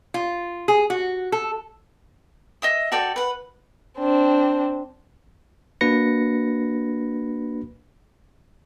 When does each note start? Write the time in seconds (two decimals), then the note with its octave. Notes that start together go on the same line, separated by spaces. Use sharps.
0.14 F4
0.68 G#4
0.90 F#4
1.32 A4
2.62 D#5 E5 D#6
2.92 F#4 A4 D5 G5
3.16 B4 F#5
3.98 C4 D4
5.81 A#3 D4 F#4 B4 A#6 C#7